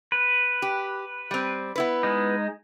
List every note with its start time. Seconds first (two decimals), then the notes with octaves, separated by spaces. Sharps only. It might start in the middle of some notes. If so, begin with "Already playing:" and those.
0.12 B4
0.62 G4
1.31 G3 C4
1.76 B3 E4 B4
2.03 G#3 D#4